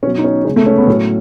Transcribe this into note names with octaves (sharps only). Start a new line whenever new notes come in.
B2 F#3 C#4
D#4
C#4
C#3 G#3 C#4
A3
C#4
B3
A2 F#3 C#4